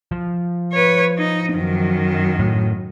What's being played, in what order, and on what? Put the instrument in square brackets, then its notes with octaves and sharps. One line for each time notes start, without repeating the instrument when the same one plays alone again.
[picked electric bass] F3
[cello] B4 C#5
D#4
F#2 D#3
[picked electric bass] A2